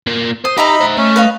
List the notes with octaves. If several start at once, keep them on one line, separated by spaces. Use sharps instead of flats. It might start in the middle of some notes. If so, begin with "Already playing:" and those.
A#2 A#3
C5 D#6
D#4 G4 D#5 E5 A#5 B5
C5 F#5
A3 C#4
B4 D#5 F5